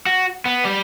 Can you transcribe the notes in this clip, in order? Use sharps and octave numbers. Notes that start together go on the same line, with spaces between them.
F#4
B3
G3